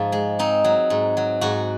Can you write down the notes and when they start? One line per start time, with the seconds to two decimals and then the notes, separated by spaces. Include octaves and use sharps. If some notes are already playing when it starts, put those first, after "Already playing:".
Already playing: G#2 F3 F4
0.12 G#3
0.39 C4 D#4
0.64 F#3
0.90 G#2
1.17 F#3
1.41 G#2 F#4